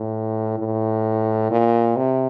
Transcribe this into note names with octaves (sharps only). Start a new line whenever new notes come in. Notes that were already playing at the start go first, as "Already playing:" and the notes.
Already playing: A2
A2
A#2
C3